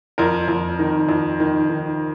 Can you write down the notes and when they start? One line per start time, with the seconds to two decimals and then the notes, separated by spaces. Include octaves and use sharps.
0.18 F2 A#4
0.48 F2
0.79 D#3
1.09 F2
1.40 D#3
1.69 D#3